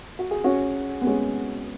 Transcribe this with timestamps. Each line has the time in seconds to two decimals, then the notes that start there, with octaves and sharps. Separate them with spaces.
0.19 F#4
0.31 G#4
0.44 C#4 F#4
1.01 B3
1.07 G#3 C#4